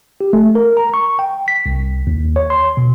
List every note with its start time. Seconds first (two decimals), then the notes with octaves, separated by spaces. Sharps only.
0.21 G4
0.33 A3
0.55 A#4
0.77 A#5
0.94 C#6
1.19 G5
1.48 B6
1.66 C2
2.07 D#2
2.36 C#5
2.50 C6
2.77 B2